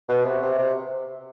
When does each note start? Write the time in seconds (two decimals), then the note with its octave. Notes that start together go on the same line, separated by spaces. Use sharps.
0.09 B2
0.25 C3
0.42 C3
0.59 C3